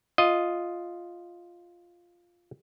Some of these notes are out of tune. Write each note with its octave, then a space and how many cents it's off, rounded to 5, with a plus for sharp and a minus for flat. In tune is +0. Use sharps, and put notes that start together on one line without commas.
F4 +0 D#5 +0